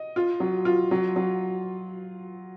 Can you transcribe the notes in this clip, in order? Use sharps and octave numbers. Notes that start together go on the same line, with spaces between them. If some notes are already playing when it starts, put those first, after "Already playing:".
Already playing: D#5
F4
F#3
F4
F#3
F#3